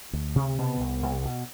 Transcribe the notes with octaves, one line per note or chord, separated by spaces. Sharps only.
D2
C3
B2 B3
C2
C2
B2